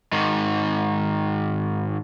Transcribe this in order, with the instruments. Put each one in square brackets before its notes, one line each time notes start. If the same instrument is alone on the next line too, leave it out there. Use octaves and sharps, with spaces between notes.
[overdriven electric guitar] G#2 D#3